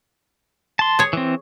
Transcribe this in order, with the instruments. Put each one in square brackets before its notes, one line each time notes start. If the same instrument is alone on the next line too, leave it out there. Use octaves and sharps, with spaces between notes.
[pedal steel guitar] A5 C6
[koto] G#4 C#5
[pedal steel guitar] E3 C4